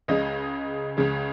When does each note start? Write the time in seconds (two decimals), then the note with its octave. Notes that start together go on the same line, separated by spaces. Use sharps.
0.08 C#2 C#3 G#3 D#5
0.97 C#2 C#3 G#3